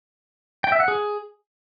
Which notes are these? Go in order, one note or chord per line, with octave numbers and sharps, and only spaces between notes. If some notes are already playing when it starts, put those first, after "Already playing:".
G5
E5
F#5
G#4